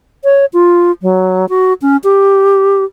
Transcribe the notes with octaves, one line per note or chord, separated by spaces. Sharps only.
C#5
F4
F#3
F#4
C#4
G4